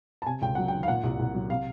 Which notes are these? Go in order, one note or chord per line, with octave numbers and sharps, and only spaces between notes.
A5
C3 G#5
C#2 G5
F#3 F#5
G5
D#3
F5
A#2 F#5
C2
C2
F#3
C3 F5